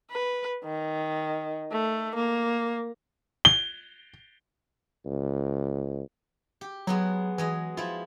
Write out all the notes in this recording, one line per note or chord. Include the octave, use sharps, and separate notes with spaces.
B4
D#3
A3
A#3
G7
C#2
G4
F#3 G#3 B3 F#4
E3 F#3 G#3 D#5
F3 E4 F4